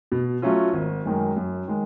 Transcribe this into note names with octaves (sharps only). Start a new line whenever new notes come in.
B2
F#3 A3 C#4 F4
G#1
F#2 D#3 G#3
F#2
D#3 G#3